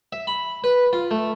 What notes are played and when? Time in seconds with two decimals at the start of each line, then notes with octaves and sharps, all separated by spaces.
0.13 E5
0.27 B5
0.64 B4
0.93 F4
1.11 A3